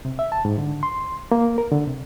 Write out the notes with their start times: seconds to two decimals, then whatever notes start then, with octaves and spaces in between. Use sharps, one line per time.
0.05 C3
0.19 E5
0.32 A5
0.45 G#2
0.58 D3
0.83 C6
1.32 A#3
1.58 A#4
1.72 D3
1.88 C3